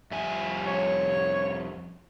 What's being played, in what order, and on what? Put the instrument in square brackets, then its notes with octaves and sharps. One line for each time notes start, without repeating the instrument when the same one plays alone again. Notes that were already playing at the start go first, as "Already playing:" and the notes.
[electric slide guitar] F2 G3 G#5 [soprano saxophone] E5
[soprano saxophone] C#5